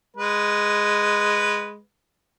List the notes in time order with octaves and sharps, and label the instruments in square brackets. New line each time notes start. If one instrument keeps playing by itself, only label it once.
[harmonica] G#3 B4